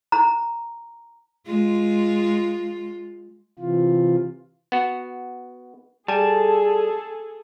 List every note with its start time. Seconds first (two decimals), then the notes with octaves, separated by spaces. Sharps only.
0.12 A#5
1.47 G#3 F4
3.59 C3 E3 F4
4.72 B3 F#4
6.08 G3 G#4 A4 G#5 A5